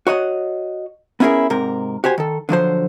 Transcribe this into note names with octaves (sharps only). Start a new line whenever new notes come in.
F#4 C#5 D#5 F#5
B3 C#4 E4 F4 G#4 A#4
G#2 C3 A#4
F#4 G4 C5 G#5
D#3 A4
D3 F3 F#3 C5